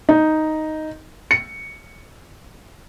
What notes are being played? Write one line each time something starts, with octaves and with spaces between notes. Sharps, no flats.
D#4
C#7